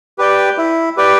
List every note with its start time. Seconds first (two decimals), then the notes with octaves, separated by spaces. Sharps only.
0.18 G4 B4 D5 G5
0.58 E4
0.97 G4 B4 D5 G5